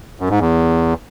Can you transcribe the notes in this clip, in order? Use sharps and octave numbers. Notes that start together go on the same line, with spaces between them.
F#2
G#2
E2